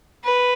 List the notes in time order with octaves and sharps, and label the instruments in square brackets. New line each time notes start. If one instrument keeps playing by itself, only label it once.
[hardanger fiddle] B4